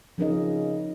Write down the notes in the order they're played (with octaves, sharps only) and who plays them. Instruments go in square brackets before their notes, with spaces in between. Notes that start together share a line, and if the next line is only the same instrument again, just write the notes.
[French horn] C#3 [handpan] F3 C4 D#4 A#4 D#5